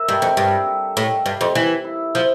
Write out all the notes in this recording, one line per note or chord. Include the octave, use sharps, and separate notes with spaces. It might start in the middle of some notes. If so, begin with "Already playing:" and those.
Already playing: A#4 E5
G2 G4
F2 G4
G2 G4
A4
A4
A2 G4
G2
F2
E3
E4
F3